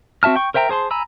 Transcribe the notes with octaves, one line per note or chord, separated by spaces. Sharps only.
C4 F#4 E5 A5 F6
G5 C#6
A#4 C5 E5 G5 A#5
G#4 C5 A5 C6
G#5 A#5 B5 E6